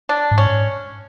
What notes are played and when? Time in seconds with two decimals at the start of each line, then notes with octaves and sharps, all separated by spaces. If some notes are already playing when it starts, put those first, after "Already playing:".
0.09 D4
0.31 G#2
0.38 C#4